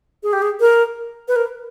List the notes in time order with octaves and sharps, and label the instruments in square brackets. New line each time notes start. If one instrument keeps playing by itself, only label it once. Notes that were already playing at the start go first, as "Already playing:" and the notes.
[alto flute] G#4
G4
G#4
A#4
B4
A#4